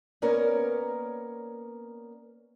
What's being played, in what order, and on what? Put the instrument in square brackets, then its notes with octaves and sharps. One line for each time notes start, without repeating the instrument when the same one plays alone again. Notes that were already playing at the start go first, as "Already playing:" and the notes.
[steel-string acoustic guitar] A#3 B3 C#4 A#4 C#5 D5